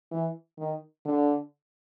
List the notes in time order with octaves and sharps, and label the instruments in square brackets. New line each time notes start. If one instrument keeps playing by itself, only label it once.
[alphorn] E3
D#3
D3